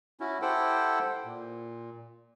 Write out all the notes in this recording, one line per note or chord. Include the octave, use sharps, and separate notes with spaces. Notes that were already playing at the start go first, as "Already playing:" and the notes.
C#4 E4 F#4
E4 G4 A4 C5 F#5 G5
A#2